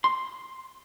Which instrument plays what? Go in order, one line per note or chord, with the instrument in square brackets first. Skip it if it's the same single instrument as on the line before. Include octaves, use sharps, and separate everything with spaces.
[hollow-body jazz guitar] C6